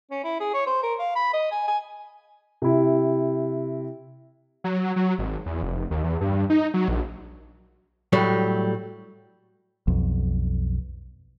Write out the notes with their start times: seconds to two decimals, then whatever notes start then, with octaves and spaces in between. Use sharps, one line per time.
0.11 C#4
0.24 E4
0.40 G#4
0.54 C#5
0.66 C5
0.83 A#4
0.99 F5
1.15 B5
1.33 D#5
1.52 G#5
1.68 G#5
2.62 C3 E4
4.64 F#3
4.96 F#3
5.19 G#1
5.46 E2
5.63 F1
5.91 D#2
6.03 E2
6.21 G2
6.50 D#4
6.74 F#3
6.88 A#1
8.13 A2 F#3 G3 A3
9.88 B1 F2